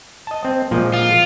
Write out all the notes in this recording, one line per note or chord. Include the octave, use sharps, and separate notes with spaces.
D#5 A5
C4
A#2 F3 G#3
F4